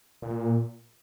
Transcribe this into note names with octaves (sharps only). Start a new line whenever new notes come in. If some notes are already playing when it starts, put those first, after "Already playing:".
A#2